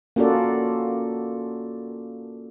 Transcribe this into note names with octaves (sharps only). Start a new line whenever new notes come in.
A#3 C#4 F4 F#4 A4 D5